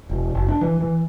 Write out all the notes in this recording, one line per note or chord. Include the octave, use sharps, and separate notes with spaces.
E1
F#1
D4
E3
E3